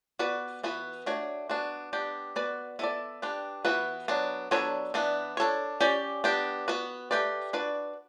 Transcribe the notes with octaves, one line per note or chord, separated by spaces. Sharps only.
B3 F#4 B4 D5
E3 B3 F#4 B4
A3 D4 F#4 C#5
B3 D4 F#4
B3 D4 G4
B3 F#4 B4 D5
B3 E4 A4 D5
D4 G4 B4
E3 B3 F#4 B4
F#3 B3 D4
F#3 B3 D4 A4 C#5
E3 B3 D4
D4 A4 C#5
C#4 G4 D5
B3 D4 G4
B3 F#4 B4
A3 C#4 G4 B4 D5
D4 F#4 B4 D5